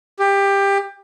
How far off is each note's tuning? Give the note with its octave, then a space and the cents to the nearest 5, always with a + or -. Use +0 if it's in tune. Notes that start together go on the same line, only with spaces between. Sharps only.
G4 +20